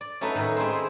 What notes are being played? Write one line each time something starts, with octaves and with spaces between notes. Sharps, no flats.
D5
F#3 A3 C#4 D#4 A4 B4
A2 D#3
G#3 C4 E4 C5